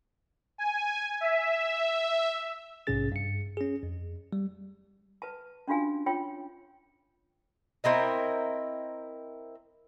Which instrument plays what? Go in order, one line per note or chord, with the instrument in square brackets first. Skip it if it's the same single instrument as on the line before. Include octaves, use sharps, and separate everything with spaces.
[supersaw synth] G#5
E5
[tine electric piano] A#1 G#2 C3 C#4 G#4 A6
G2 C#7
C#4 G#4
F2
G3
[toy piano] B4 A5
C#4 D4 F4 F#4 F5 G#5
F4 C#5 G5
[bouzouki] C4 E4 A#4 D#5